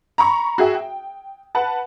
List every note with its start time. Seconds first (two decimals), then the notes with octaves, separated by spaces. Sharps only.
0.18 A#5 B5 C#6
0.58 F#4 G#4 E5 G5
0.75 G5
1.55 B4 F#5 A5